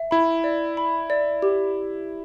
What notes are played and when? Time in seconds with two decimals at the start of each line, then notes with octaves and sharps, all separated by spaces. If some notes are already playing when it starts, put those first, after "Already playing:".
Already playing: E5
0.11 E4 B5
0.44 D5
0.77 B5
1.10 D5
1.42 G4